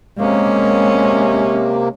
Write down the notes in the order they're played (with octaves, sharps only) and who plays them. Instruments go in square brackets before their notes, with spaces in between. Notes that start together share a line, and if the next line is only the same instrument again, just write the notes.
[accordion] C3 A#3 [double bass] G#3 C#4